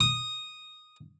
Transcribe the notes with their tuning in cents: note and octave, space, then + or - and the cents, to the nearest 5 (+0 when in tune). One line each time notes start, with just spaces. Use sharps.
D#6 -5